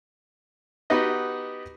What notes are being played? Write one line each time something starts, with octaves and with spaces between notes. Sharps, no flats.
B3 D#4 F#4 G4 B4 D#5